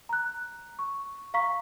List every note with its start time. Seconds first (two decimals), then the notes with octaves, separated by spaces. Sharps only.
0.09 A#5 F#6
0.79 C#6
1.34 F5 A#5 C#6 B6